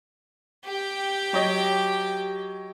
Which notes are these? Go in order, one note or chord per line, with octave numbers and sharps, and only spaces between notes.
G4 G5
F#3 C#5 D#5